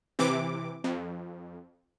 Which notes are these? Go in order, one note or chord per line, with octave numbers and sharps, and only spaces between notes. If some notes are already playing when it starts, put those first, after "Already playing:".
C3 E3 D6
F2